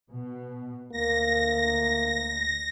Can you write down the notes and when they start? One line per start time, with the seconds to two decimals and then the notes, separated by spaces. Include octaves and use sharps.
0.12 B2
0.92 D2 A#3 A#6